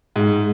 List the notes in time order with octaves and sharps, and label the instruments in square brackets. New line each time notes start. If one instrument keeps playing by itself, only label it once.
[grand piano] G#2